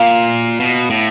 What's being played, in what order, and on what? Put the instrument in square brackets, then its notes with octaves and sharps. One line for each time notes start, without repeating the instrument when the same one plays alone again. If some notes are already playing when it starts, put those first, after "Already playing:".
Already playing: [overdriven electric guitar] A#2 [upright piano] F5
[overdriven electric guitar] B2
A2